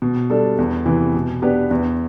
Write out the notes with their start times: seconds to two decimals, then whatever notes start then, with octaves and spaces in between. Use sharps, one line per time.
0.02 B2
0.30 G3 D4 A4
0.58 E2
0.86 C3 E3
1.14 B2
1.42 B3 D4 G4 B4
1.71 E2